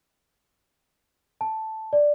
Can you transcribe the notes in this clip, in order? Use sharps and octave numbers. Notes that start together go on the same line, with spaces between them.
A5
D5